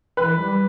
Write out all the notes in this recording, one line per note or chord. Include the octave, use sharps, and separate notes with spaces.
E3 B4
G3